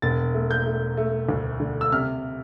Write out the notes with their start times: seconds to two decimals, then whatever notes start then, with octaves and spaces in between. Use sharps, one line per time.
0.02 E1 A6
0.34 A3
0.51 G6
0.66 A3
0.97 A3
1.29 D2
1.60 D3
1.81 E6
1.92 C3 F6